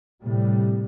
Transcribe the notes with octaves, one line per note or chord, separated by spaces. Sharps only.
A2 C3 G3